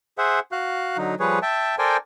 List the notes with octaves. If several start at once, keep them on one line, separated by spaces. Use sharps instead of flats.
G#4 C5 E5 F#5
F#4 F5 F#6
D3 F#3 D#4
F3 G3 G#4 B4 C#5
E5 G5 A5
A4 A#4 C5 D5 G5 G#5